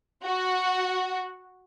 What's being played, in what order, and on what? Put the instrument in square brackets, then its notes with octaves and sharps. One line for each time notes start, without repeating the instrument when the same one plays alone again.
[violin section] F#4